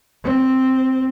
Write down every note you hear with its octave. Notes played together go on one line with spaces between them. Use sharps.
C4